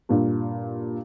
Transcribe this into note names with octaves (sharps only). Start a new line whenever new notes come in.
G2 A#2